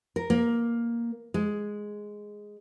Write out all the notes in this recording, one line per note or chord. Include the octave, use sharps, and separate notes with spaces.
A#4
A#3
G#3